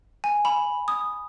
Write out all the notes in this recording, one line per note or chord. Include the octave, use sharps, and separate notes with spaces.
G#5
B5
D#6